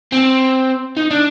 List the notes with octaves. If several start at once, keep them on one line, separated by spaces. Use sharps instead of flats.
C4
D#4
D4